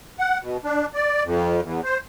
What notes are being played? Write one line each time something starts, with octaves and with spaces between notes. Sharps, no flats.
F#5
B2
D4
D5
F2
E2
C5